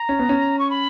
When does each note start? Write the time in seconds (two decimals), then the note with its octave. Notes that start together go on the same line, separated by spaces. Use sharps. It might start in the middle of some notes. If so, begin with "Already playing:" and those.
Already playing: A#5
0.09 C#4
0.19 B3
0.29 C#4
0.59 C#6
0.70 B5